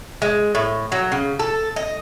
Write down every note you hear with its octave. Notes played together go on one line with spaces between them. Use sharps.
G#3
A2
F#3
C#3
A4
D#5